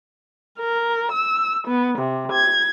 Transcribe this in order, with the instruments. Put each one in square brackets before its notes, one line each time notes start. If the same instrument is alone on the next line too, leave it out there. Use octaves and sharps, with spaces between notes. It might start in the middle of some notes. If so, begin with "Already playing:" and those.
[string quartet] A#4
E6
B3
C3
G#6